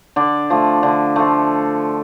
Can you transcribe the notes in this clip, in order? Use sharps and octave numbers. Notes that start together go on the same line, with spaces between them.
D3 D5
F3 A3
D3
F3 A3